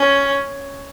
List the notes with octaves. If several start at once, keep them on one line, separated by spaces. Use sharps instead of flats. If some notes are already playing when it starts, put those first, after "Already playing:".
Already playing: C#4